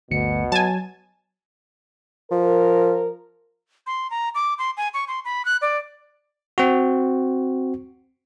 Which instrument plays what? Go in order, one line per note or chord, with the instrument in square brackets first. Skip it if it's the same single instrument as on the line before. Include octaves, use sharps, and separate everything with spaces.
[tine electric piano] G1 D2 C#7 [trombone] B2
[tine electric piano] F#3 [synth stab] G#5 A5
[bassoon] F3 [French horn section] A#4
[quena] C6
A#5
D6
C6
G#5
C#6
C6
B5
F#6
D5
[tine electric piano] C4 F#4